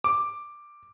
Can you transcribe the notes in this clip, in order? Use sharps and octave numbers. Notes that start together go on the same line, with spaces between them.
D6